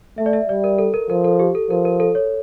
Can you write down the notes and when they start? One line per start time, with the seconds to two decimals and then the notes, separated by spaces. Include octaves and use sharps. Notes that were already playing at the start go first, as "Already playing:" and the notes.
0.18 A3 E5
0.26 D5
0.33 E5
0.49 G3 D5
0.64 A#4
0.78 A4
0.94 A#4
1.10 F3 A#4
1.24 A4
1.39 G4
1.55 A4
1.70 F3 A#4
1.85 A#4
2.00 A4
2.15 C#5